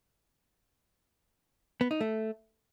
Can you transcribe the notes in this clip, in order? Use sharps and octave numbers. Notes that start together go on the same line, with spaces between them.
B3
D#4
A3